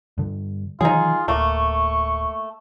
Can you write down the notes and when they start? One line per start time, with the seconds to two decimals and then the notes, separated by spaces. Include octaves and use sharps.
0.18 G2 D3
0.81 D#3 E3 F#3 D#4 F4 G#4
1.28 D1 A3 A#3 C#6